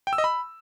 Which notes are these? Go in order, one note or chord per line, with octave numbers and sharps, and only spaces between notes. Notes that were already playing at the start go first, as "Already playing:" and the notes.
G5
E6
D#5
B5